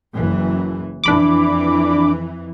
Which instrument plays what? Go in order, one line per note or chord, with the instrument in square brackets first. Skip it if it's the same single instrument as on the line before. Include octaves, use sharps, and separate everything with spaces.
[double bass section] F#1 E3
[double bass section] F2 E3 [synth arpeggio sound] D4 B5 D6